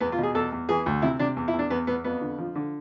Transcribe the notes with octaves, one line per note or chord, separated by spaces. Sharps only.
E2 B3
F4
B2 G#4
E2 A4
E2
E3 G#4
D2
C3 E4
C3 D4
E2
E4
E2
D4
E2 B3
E2 B3
F2 B3
D3
F3
D3